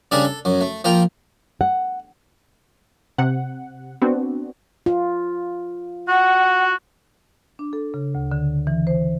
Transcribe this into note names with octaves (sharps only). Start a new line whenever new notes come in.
C#3 G3 D4 G#4 A#4 A5
A4
F#2 F#3
A3
F3 A#3 F4 A#4 G5
F#5
C3 F#5
B3 C4 D4 F#4
F4
F#4 F#5
D4
A4
C#3
D2
D3
E3
C5